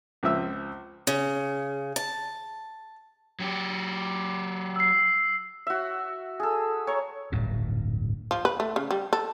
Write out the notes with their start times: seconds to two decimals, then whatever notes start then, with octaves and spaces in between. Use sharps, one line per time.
0.23 C#2 F3 C4 E5 E6
1.07 C#3
1.96 A5
3.40 F#3 G4
4.76 E6 C7
5.67 F#4 E5
6.40 G#4 A4
6.87 C#5 A#5 C#6
7.32 D1 G1 G2 A#2
8.31 F3
8.45 B4
8.60 A3
8.76 C#3
8.91 G3
9.13 A4